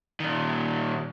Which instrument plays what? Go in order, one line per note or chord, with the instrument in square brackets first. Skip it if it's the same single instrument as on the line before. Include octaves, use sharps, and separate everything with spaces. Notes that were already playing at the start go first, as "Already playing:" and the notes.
[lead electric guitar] A#2 D#3